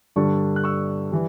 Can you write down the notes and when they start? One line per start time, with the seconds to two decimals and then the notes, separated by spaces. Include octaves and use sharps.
0.16 G2 D3 G3 D4 A5 C#6
0.56 F#6
0.64 C#6 E6
1.12 E3 G3